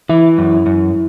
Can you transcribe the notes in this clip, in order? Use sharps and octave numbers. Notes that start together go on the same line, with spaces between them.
E3 E4
F#2
F#2